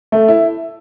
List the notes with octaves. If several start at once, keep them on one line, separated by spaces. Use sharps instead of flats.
A3
E4